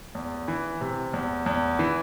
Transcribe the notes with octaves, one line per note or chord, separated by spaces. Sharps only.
E2
E3
C3
E2
E2
E3